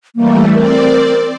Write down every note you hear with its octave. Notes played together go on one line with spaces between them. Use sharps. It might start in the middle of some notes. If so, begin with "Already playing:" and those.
E3 G3 A3 A#3
C4 A#4 D5